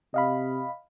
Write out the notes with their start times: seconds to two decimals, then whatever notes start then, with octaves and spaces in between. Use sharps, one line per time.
0.14 C3 D#5 F5 B5